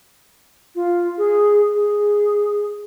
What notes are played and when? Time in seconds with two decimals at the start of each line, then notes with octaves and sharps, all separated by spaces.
0.75 F4
1.18 G#4
1.75 G#4